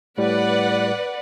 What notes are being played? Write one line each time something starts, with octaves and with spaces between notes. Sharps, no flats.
A2 G3 B4 D5 F#5